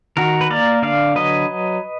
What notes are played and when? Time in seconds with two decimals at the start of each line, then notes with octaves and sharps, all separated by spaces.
0.17 D#3 F#4 A#4
0.41 B4
0.50 A#3 A#4 D5
0.82 D3 D5 F5
1.15 F#3 B4 D#5